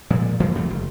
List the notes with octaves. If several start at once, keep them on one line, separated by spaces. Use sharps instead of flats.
A#2 F3 G#3
F#1 E3 F3 A#3
F2 C3 A3
F#1